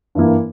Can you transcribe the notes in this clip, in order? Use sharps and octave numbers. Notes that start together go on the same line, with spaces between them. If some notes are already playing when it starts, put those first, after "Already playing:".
G2 E3 A#3